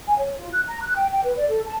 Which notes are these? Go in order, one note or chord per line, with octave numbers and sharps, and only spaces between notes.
G#5
C#5
F4
F#6
A#5
F#6
G5
G5
B4
D5
A4
A5